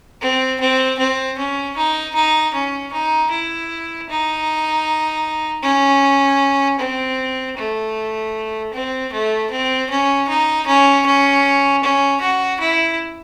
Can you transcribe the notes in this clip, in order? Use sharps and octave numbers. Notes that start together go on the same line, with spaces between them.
C4
C4
C4
C#4
D#4
D#4
C#4
D#4
E4
D#4
C#4
C4
A3
C4
A3
C4
C#4
D#4
C#4
C#4
C#4
F#4
E4